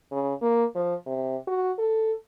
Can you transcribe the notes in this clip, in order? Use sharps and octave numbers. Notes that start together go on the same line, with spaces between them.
C#3
A#3
F3
C3
F#4
A4